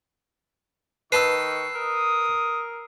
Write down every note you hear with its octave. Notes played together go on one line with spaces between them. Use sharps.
D#3 B4 A5 C6 C#6 E6 C7
A#4 D#6